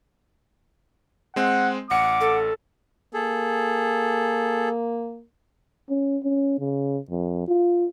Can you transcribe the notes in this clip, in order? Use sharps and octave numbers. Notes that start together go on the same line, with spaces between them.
G#3 C4 F#5
A1 F#5 D6 C#7
A4
A#3 G#4 A4
C#4
C#4
C#3
F2
F4